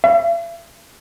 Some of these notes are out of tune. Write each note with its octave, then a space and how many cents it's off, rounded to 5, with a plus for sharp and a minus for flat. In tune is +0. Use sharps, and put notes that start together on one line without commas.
E5 +45